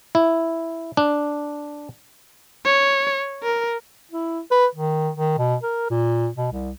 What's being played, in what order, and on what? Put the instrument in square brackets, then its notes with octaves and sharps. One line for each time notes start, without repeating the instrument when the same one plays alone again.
[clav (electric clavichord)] E4
D4
[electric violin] C#5
A#4
[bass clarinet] E4
B4
D#3
D#3
B2
A#4
A#2
B2
C2